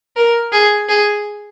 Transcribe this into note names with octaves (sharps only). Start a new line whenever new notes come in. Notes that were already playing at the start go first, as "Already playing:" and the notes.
A#4
G#4
G#4